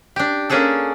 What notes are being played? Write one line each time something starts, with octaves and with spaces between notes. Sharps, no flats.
D4 G4
A#3 C#4 D4 G#4 A4